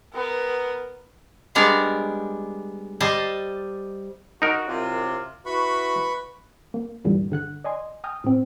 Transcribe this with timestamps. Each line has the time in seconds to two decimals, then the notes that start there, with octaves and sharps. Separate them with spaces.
0.13 B3 A#4
1.55 G3 G#3 B3 D4 A#4 D5
3.00 G3 C5 D#5 A5
4.42 D#4 F#4 A#4
4.67 C2 F#2 C3 F4
5.46 E4 F#4 B4 B5 C#6
6.74 A#3
7.04 D2 G2 A#2 D3 E3 G3
7.30 G1 D3 F#5 F#6
7.64 D5 D#5 G#5 C6
8.04 G5 G#5 A#5 D#6 F6
8.24 A2 C4